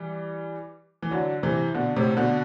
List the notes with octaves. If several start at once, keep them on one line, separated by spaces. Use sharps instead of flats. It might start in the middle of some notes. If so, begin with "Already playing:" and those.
Already playing: E3 G3
E3
D3 F#3
C3 E3
B2 D3
A2 C3
B2 D3